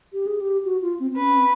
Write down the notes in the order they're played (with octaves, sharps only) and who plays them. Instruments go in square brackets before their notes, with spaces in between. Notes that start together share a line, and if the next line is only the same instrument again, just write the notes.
[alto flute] G4
G#4
G4
F#4
F4
C4
C4
[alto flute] C#4 [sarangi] B4
[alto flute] C4